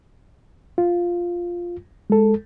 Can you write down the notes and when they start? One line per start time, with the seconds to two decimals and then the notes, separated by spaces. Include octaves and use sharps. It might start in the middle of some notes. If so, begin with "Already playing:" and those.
0.78 F4
2.10 G#3 A4